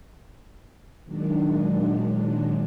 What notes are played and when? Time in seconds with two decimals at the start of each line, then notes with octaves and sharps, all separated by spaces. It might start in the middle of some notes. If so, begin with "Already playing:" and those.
1.04 A#2 D#3 F#3 G#3 D4